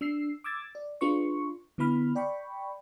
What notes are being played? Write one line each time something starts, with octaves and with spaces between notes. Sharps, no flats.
D4 E6 C7
D6 E6 G#6 A6
D5
D4 F4 G#4 B4 C6 C#6
D3 B3 E4 B5 F6
D5 G5 B5 C#6